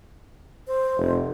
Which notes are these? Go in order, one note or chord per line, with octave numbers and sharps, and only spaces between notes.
C5
F1